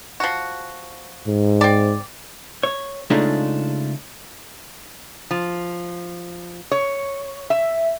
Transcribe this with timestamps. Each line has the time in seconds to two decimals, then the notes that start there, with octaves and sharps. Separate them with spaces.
0.20 F3 F#4
1.27 G#2
1.61 C4 D5
2.63 C#5
3.10 C#3 G#3 A3 D4 D#4 F4
5.31 F3
6.71 C#5
7.50 E5